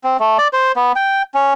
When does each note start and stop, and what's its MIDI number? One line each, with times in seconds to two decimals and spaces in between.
0.04 0.17 60
0.20 0.38 57
0.38 0.48 74
0.53 0.72 72
0.76 0.92 59
0.96 1.22 79
1.34 1.54 61